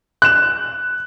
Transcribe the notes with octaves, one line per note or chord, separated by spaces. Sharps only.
F#6 E7